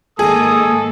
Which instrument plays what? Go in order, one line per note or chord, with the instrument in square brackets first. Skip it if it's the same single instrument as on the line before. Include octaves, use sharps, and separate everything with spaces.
[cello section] G#2 D#3 A#3 [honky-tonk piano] G#4 [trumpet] A4 [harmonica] D#6